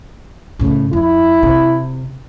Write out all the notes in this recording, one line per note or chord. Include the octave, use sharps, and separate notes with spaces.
A2 C#3
F2 E4
C3